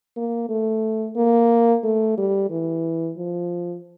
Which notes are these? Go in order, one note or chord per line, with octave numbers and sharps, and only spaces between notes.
A#3
A3
A#3
A3
G3
E3
F3